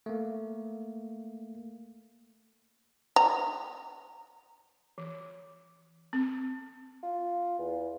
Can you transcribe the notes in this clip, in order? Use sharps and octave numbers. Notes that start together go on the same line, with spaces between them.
A3 A#3
A#5
E3
C4
F4
E2